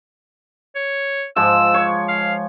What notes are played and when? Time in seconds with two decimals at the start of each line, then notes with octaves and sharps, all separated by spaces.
0.75 C#5
1.36 G#2 F3 E6
1.74 C#5
2.08 F5